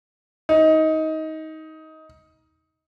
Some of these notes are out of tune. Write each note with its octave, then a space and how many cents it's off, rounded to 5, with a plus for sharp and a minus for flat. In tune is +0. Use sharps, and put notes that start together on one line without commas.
D#4 +20